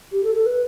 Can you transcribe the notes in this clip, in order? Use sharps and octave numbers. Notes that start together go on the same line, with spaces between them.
G4
A4
A4
B4